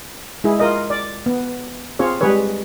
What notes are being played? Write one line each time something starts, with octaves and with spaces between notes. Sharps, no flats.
G#3 E4 G#4
F4 A#4 D#5
D5
B3
C4 F4 G#4 C#5
G3 G#3 G#4 B4 C#5